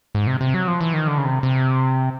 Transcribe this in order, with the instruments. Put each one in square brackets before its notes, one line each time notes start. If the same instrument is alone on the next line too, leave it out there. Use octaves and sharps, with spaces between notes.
[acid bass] G#2
C3
C3
F#3
F3
E3
D#3
D3
C#3
C3
C3